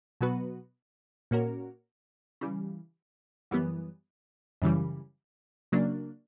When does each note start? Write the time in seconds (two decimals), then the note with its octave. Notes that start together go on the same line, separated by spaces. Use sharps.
0.21 B2 F#3 B3 F#4 B4
1.31 A#2 A#3 C#4 F#4 A#4
2.41 C#3 E3 G3
3.51 F#2 E3 G3 B3
4.62 F#2 C#3 E3 G3
5.72 C#3 F#3 A#3 D4